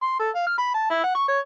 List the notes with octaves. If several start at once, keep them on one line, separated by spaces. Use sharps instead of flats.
C6
A4
F5
F6
B5
A5
E4
F#5
C#6
C#5